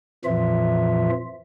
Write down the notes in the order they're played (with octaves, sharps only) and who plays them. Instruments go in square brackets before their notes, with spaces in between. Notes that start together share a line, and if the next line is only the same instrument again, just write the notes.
[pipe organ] F2 A#2 E3 F3 F4 E5